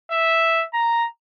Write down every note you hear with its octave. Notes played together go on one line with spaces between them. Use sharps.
E5
A#5